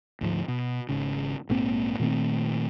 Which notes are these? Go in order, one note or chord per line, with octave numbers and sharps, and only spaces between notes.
D2 G#2 F3
B2
G#1 C#3
A#1 G#2 A#3 C4
A#2 D#3 A3 C4